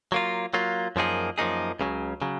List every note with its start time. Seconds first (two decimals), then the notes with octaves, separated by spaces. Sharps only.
0.12 F#3 A#3 F4
0.54 F#3 A#3 F4
0.96 F#2 F3 A#3 D#4 G#4
1.38 F#2 F3 A#3 D#4 G#4
1.80 C#2 C#3 F#3
2.21 C#3 F#3